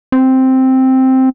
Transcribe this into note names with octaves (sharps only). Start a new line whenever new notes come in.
C4